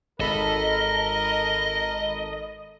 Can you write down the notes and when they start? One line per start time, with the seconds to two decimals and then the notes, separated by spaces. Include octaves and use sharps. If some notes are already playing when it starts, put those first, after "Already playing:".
0.20 G#1 A4 A#4 D#5 B5